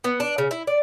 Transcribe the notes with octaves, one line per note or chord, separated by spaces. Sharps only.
B3
D4
C#3
E4
D5